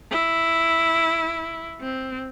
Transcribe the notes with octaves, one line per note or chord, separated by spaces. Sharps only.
E4
C4